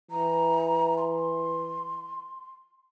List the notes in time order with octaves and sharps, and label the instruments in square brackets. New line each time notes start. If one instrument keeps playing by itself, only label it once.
[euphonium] E3 [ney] A#5
[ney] C6